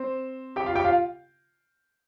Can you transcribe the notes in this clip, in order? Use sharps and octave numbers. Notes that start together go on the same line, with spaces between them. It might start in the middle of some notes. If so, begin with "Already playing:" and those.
Already playing: C4 C5
G4 G5
F4 F5
G4 G5
F4 F5